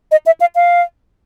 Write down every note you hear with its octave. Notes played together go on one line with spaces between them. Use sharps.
D#5
E5
F5
F5